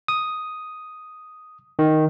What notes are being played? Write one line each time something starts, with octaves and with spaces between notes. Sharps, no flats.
D#6
D#3